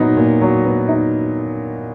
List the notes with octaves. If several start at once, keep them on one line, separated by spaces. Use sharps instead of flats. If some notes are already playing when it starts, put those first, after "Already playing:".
Already playing: A#2 F#3 B3 D#4
A#2
F#3
B3
D#4